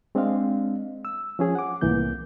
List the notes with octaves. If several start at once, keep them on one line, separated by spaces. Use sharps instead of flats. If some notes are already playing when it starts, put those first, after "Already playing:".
G#3 C4 D4 D#5 F5
E6
F3 C#4 G#4
F#5 D6
C2 A2 E3 A#3 G6